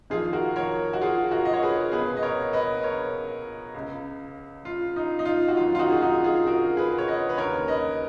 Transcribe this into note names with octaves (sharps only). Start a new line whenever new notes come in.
F2 D#3 F4 G#4
F#4 A#4
A#4 C#5
F#4
F4 G#4
F#4 A#4
D#5
C#5
G#4 B4
C#2 B2 G#4 B4
D#5
A#4 C#5
B4 D#5
A#4 C#5
C#2 C#3
F4
D#4
D#4
F4
F#4
F#2 D#3 F4
F4
D#4 F#4
G#4
D#4 F#4
F4 G#4
G#4
F#4 A#4
G#4 B4
C#5
B4 D#5
B4
D#2 C#3 A#4 C#5
B4 D#5